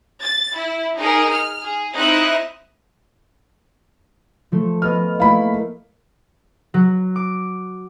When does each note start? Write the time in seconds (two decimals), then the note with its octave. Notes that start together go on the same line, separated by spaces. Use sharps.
0.22 A6
0.55 E4
0.98 D#4 G#4 A#4
1.32 F6
1.62 G#4
1.96 C4 D#4 E4 D#5 E5 F#6
4.52 F3 A3
4.82 B3 D#5 F5 F6
5.20 A3 A#3 E4 F5 B5
6.74 F#3
7.16 D6